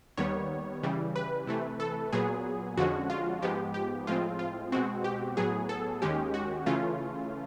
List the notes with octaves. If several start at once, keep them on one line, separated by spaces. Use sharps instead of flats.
D#2 D#3 G3 B3 C#5
C#3 E3 G3
B4
C3 E3 A3
A4
A#2 F#3 B3 G#4
F2 D3 F3 G#3 C#4 F#4
F4
G#2 F3 G#3 B3 G4
G4
A2 F3 G#3 C4 F4
F4
B2 G#3 C4 F#4
G4
A2 F#3 B3 G#4
A4
D#2 D#3 G#3 C#4 G4
F#4
C#3 E3 A3 C#4 F4